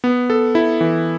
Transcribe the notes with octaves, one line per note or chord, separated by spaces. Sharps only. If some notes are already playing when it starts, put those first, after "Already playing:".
B3
A4
E4
E3